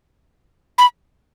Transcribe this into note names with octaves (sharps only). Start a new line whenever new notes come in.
B5